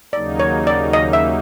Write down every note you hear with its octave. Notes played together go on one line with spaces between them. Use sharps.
D#2 C#3 F#3 A#3 D#4 D5
C#5
D5
D#5
E5